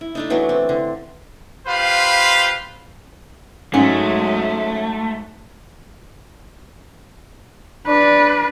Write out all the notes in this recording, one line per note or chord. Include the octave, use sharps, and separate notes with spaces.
E4
A3 D4 D#4
E3 F#3 B3 D4
C4
D3
F4 G4 B4 C5 F5 B5
G#2 F#3 G#3 A3 C#4
D4 B4